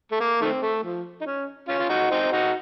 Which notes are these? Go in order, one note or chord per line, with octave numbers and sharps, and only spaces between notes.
A3
A#3
D#3 A3 C4
A3
F3
D#4
C#4
C#4 F4
F4
D#4 F#4
C4 D#4
D#4 F#4